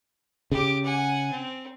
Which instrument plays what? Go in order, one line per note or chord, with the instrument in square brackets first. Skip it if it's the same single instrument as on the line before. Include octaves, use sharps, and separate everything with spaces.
[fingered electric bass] C#3 [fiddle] G4 D6
[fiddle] F#5 G#5
C4